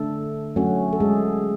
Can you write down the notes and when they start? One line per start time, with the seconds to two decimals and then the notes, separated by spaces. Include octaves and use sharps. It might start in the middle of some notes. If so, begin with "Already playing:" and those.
Already playing: D3 A3 D4 A4
0.56 F#3 A3 C#4 F#4
0.93 A4
1.00 G#3 G#4